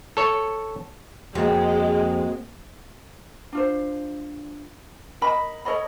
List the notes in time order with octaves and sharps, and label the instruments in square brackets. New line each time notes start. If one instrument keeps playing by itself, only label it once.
[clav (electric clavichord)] A4 C#5
[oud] F2 [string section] G#3 [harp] A#3 F#4
[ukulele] D4 F4 C5
A#4 D#5 B5
A4 C#5 D#5 B5